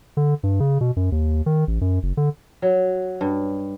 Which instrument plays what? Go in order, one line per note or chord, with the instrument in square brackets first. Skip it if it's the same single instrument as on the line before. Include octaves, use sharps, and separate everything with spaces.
[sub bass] D3
G2
C#3
B2
F#2
D#2
D#3
A1
F#2
F#1
D3
[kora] F#3
G2